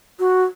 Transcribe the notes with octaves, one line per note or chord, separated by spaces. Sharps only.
F#4